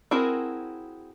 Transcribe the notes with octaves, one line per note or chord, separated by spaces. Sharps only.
C4 E4 F#4 G#4 A#4